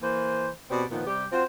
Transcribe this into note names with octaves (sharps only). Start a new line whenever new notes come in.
E3 A#3 C5
B2 C4 G4 D5
A#2 D#3 F3 B3
C3 G3 G4
C4 F4 F#4 C5